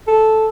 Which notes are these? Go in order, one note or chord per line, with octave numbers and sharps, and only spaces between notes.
A4